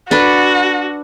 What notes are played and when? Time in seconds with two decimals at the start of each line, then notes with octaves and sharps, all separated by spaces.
0.11 D4 F#4 A4 B4